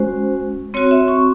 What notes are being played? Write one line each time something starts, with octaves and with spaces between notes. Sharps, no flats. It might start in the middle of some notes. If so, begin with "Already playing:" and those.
Already playing: G#3 C#4 F#4 C5
C4 F#4 C#5
E5
C#6